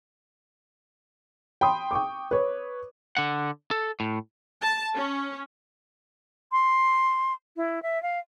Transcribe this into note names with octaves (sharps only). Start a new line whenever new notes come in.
G5 B5 C6 D#6
G5 C#6 D6
B4 C#5
D3 F#5
A4
A2
A5
C#4
C6
E4
E5
F5